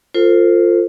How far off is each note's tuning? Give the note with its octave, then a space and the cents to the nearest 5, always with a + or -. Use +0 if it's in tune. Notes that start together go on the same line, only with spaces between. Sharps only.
F4 +0 A4 +40 C5 +0